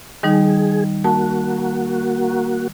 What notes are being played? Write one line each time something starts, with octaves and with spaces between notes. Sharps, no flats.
D#3 G3 D#4 G#4
A#3 F#4 A5